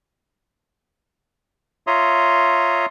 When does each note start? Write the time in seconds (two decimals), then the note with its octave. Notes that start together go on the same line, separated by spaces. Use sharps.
1.87 F4 C#5 E5 A#5 C6 D#6